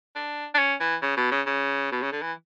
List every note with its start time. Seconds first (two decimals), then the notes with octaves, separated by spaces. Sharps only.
0.16 D4
0.54 D4
0.59 C#4
0.80 E3
1.02 C#3
1.17 B2
1.31 C#3
1.46 C#3
1.92 B2
2.02 C#3
2.12 D3
2.22 E3